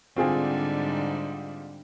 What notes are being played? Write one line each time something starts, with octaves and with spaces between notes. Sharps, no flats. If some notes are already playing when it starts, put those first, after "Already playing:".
G#2 D3 G3 C4 F4 G#4